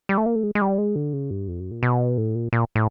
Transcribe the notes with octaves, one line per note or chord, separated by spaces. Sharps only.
G3
A3
A#3
A3
G#3
G#3
G3
G#3
D3
C#3
G2
F2
F#2
A#2
B2
A2
A#2
A#2
A2